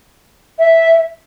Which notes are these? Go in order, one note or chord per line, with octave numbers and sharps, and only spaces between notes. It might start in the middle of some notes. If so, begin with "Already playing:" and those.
E5